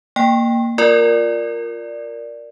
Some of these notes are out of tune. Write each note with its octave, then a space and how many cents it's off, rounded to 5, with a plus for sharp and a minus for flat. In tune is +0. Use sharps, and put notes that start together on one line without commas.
A#3 +0 G5 +10
F4 +5 A#4 +0 D5 +0